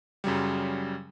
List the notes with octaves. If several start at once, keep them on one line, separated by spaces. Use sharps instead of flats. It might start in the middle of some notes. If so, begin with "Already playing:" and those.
F#2 C#3 F#3 G3